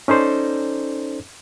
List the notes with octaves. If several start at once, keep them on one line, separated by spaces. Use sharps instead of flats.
C#4 D#4 A4 C5 D5